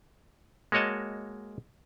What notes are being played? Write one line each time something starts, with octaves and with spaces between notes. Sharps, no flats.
G#3 A#3 F#4 C#5 D#5 A5